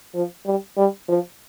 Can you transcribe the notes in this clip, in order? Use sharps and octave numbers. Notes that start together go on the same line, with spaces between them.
F3
G3
G3
F3